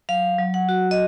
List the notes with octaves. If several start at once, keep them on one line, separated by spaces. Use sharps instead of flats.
F#3 F5
F#3
F#5
F#4
D#5